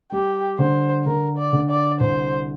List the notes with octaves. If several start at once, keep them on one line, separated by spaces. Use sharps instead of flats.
G3 G4
D3 C5
D3 A#4
D5
D3
D5
C2 C5